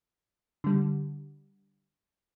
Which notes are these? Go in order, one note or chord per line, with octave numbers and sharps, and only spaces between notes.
D3 G3